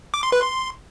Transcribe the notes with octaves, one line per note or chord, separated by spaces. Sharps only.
D6
C6
B4
C6